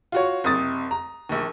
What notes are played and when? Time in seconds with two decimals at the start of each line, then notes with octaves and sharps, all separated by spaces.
0.12 F4 F#4 C#5
0.44 F#1 C3 D#6 A6
0.91 A#5
1.29 A#1 D#2